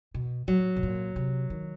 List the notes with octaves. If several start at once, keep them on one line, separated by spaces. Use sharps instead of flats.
B2
A2 F#3
B2
A#2
C3
D#3